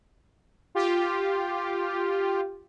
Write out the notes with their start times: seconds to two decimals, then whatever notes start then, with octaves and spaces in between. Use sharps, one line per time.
0.75 F4 G4